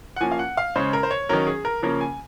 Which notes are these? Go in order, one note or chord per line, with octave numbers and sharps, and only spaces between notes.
F#5
F3 A#3 C#4 G#5
F5
F#5
F5
C#3 G#3 C#4 C5
A#4
C5
C#5
D#3 F#3 C#4 A#4
G#4
A#4
C#3 F3 A#3 C#4 A#4
G#5